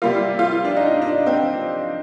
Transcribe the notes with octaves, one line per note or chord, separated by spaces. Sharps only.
C3 G3 A#3 F4
F4
D4
D#4
D4
C4